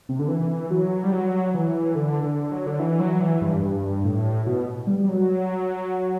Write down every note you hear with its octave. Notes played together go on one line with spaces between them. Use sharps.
C3
D3
E3
F#3
G3
F#3
E3
D3
D3
F#3
D3
E3
F#3
E3
G2
G2
A2
B2
G3
G3
F#3